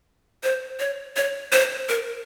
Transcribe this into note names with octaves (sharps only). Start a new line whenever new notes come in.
C5
C#5
C#5
C5
A#4